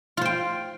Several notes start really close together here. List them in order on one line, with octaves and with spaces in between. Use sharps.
F4 C5 G5